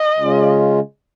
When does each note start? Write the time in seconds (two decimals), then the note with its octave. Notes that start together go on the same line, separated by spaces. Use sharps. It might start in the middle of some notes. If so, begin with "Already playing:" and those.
Already playing: D#5
0.18 C#3 G#3 C#4 F4